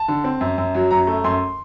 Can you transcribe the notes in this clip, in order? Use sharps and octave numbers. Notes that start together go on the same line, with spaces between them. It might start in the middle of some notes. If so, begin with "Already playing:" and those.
Already playing: A5
D3
C4
F#2
F#2
F#3
F#2 A#5
A3
F#2 C6